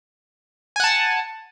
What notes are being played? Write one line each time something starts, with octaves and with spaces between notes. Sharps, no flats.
F#5 G#5 A5